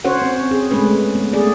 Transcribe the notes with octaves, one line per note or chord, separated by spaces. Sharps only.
C#4 F#4 C5 C#5 F#5
C4
G#4
G#3 A3 C#4 B4
B3
A3 G#4 D5